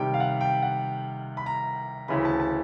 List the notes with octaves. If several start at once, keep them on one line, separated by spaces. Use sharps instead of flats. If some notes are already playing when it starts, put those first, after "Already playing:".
Already playing: C3 D#3 G3 G5
F5
F#5
G5
F#5
B5
A#5
D2 C#3 E3 B5
A5
A5